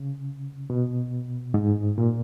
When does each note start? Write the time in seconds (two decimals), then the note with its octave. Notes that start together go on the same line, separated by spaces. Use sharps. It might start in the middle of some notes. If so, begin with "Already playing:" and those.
Already playing: C#3
0.70 B2
1.54 G#2
1.98 A#2